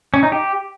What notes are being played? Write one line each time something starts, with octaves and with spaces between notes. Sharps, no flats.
C#4
D#4
G4